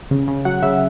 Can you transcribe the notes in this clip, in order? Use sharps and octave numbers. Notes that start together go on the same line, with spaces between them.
C#3
C#3
F#3 F#5
C#3 E5